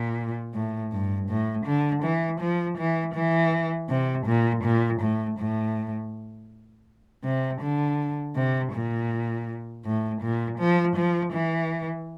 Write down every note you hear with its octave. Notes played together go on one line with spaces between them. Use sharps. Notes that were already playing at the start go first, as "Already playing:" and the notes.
Already playing: A#2
A2
G2
A2
D3
E3
F3
E3
E3
C3
A#2
A#2
A2
A2
C3
D3
C3
A#2
A2
A#2
F3
F3
E3